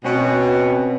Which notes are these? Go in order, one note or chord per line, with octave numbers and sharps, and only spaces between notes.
B2 C4 C#4 F#4